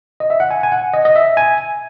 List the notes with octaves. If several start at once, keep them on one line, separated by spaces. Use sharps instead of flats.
D#5
E5
F#5
G#5
G#5
F#5
D#5
D#5
E5
G#5